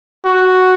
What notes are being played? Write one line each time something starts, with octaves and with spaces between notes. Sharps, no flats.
F#4